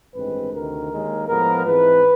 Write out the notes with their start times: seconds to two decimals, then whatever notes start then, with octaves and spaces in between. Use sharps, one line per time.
0.15 A1 G2 D#3 G#3 C4 B4
0.52 D2 C3 D#3 A#4
0.90 D#2 D#3 G#3
1.27 A2 F3 G#3 B3 A#4
1.65 G#2 E3 G#3 C4 B4